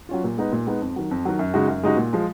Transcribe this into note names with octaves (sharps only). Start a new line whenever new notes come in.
F#3 C#4 F4
A#2
G#3 B3 D#4
A#2
G#3 B3 D#4
F2
D#3 F#3
F2
D#3 F#3
F#2
C#3 G#3 D#4 F#4
F#2
C#3 G#3 D#4 F#4
A#2
F3 G#3